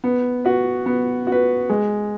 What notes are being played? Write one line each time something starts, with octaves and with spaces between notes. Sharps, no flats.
B3
F#4 B4
B3
F#4
B4
G#3